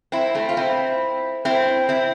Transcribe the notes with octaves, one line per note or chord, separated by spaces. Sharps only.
C4 E4
A3 C4
F4
C4 E4
C4 E4
C4 E4